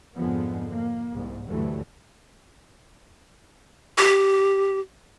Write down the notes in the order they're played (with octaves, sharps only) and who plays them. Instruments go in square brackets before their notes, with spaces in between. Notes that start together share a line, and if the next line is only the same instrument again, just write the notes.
[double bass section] F2 G#2 D3 F3 G#3 B3
A#3
C2 G#2
D2 G2 E3 F#3 A3
[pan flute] G4